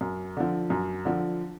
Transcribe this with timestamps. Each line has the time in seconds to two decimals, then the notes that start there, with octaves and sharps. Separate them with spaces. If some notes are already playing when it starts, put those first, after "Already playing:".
0.01 F#2
0.37 D3 F3
0.70 F#2
1.05 D3 F3